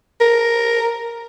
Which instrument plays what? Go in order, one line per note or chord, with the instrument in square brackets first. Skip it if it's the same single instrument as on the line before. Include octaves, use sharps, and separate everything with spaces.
[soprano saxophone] A#4